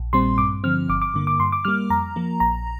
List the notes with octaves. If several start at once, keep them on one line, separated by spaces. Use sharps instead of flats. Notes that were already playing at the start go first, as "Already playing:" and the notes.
Already playing: A#1
A#2 G3 C4 C6
G2 D6
D3 F3 C4 F6
G1 D6
D6
G2 D3 A#3
D6
G2 C6
D6
G3 A#3 F6
F2 A#5
F3 A#3
A#1 A#5